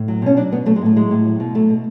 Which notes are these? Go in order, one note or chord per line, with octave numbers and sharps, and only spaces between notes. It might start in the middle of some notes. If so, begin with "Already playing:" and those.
Already playing: A2
F#3
B2 C#4
F#3 D4
B2 B3
F#3 A3
G#3
A2 A3
F#3 G#3
A2
F#3
B2
F#3 A3
B2